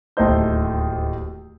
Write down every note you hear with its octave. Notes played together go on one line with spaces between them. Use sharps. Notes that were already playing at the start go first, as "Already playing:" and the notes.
D1 D#2 A3 D#4 C5 G6